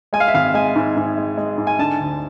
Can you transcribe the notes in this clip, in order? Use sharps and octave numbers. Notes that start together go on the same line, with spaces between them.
G#3 G#5
F5
E5
G#1 F5
G#3 G#5
G#2
G#2
G#3
G#3
G#2
G#5
D3 A5
D2